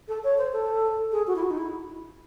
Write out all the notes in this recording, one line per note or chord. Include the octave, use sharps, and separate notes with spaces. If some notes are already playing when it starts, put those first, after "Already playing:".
A4
C#5
C5
A4
G#4
F#4
E4
F#4
D#4
E4